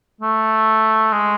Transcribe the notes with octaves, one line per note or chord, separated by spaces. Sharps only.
A3
G#3